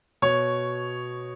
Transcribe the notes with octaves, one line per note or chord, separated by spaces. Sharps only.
B2 C#5